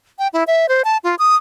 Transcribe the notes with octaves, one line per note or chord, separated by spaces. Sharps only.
G5
E4
E5
C5
A5
F4
D#6